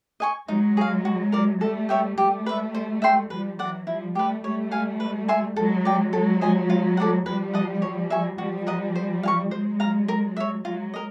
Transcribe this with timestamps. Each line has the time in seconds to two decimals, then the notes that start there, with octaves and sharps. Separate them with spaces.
0.20 D#5 G#5 C#6
0.48 F#3 G#3 D#4
0.77 G#4 C#5 F5
1.05 F#4
1.32 A#4 D5
1.61 G3 A3 A4
1.89 C#5 E5 G5
2.18 G3 A3 G4
2.46 B4 E5
2.75 C5
3.02 E5 G5 C6
3.30 F3 G3 B4
3.59 E3 F#3 D5 F#5
3.86 F3 G3 E4
4.15 G3 A3 G4 B4
4.43 G3 A3 C#5
4.71 F5 G#5
5.00 B4
5.28 E5 G#5 C6
5.56 F#3 G#3 A4
5.85 D5 G5
6.13 F#3 G#3 A4
6.41 C5 D#5 G#5
6.70 F4
6.97 A4 D5 F#5
7.26 F3 G3 B4
7.53 D#5 F#5 A5
7.82 C#5
8.10 E5 G#5 C#6
8.38 F3 G3 F#4
8.67 A#4 D#5 F#5
8.95 C5
9.23 F5 G#5 C#6
9.51 F#3 G#3 C5
9.80 F5 A#5
10.08 A#4
10.37 C#5 E5
10.65 F#3 G#3 F4
10.94 A#4 D#5